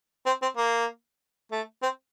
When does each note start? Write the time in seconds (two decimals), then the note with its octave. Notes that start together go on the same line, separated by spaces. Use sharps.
0.26 C4
0.42 C4
0.57 A#3
1.52 A3
1.83 C4